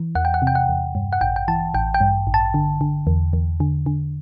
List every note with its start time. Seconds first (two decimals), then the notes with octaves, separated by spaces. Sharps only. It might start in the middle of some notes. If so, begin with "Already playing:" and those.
Already playing: E3
0.15 E2 F#5
0.25 G5
0.34 F#5
0.42 C3
0.47 G5
0.55 F#5
0.69 E2
0.95 G2
1.13 F#5
1.21 A1 G5
1.36 G5
1.48 E3 A5
1.74 A1 G5
1.94 G5
2.01 G2
2.27 A1
2.34 A5
2.54 D3
2.81 D3
3.07 E2
3.33 E2
3.60 D3
3.86 D3